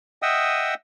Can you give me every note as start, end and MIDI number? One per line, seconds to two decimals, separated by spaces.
0.22 0.74 75
0.22 0.74 76
0.22 0.74 78
0.22 0.74 79
0.22 0.74 87
0.22 0.74 88